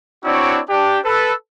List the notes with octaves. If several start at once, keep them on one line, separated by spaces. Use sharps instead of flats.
C4 D4 E4 F#4 C#5 D5
D4 G4
A4 B4